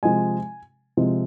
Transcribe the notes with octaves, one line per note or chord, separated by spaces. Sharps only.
C3 F3 G#3 G#5
C3 F3 G#3